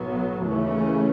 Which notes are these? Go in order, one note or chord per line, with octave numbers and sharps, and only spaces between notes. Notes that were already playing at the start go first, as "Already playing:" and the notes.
Already playing: B1 A2 F#3 B3
D#2 C#3 E3 A3 C#4